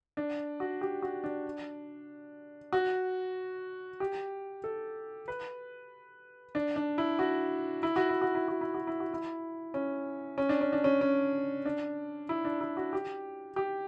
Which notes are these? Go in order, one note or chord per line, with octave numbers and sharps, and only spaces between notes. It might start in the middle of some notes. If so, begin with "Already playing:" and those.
D4
F#4
G4
F#4
D4
F#4
G4
A4
B4
D4
D4
E4
F#4
E4
F#4
E4
F#4
E4
F#4
E4
F#4
E4
F#4
E4
C#4
C#4
D4
C#4
D4
C#4
C#4
D4
E4
D4
E4
F#4
G4
G4